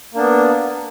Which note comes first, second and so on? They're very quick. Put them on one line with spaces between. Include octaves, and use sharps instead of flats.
A#3 D4 B3